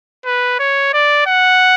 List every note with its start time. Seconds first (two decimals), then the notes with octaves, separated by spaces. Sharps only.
0.25 B4
0.59 C#5
0.93 D5
1.26 F#5